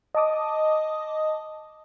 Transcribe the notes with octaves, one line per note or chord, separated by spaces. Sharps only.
D#5 A5 D6 D#6